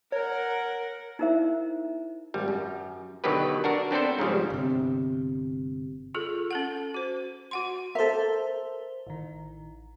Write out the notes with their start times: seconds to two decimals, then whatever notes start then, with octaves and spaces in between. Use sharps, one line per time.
0.12 A#4 C#5 F#5
1.19 D#4 E4 A#4 C5 E5
2.34 G#1 G3
2.48 F#2
3.24 B2 D3 D#3 F#3 G4 B4
3.64 D4 F#4 A#4
3.91 B3 C4 D4 A4 C5
4.19 G#2 C#3 F3 G3
4.50 G1 C3
6.15 F4 G#4 A4
6.51 C#4 A4 F#5
6.94 F#4 C5
7.51 F#4 F#5 C6
7.95 A4 A#4 C5 E5
9.07 A1 D#3